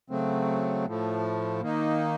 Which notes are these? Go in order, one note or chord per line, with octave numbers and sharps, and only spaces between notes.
C#3 F#3 A3 C4
A2 F3 A3
D#3 A#3 D#4